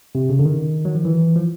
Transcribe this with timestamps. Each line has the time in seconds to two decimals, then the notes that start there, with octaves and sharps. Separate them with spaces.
0.15 C3
0.30 C#3
0.39 D3
0.45 D#3
0.85 F#3
0.95 F3
1.05 E3
1.36 F3